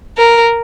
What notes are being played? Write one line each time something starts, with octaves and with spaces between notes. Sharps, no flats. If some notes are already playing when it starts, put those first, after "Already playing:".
A#4